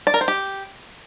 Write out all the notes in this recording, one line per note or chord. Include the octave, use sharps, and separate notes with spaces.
D5
A#4
C5
G4